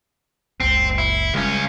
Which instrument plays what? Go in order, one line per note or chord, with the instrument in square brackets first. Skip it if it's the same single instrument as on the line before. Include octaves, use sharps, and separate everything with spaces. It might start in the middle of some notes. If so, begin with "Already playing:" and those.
[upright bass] F#1 C#2 [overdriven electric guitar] C4
[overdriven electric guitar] E4
[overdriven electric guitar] C#2 C#4 [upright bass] G3 G#3